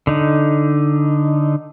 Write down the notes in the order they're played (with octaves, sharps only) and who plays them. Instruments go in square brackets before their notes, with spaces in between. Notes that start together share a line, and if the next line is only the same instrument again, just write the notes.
[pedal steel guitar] D3 D#4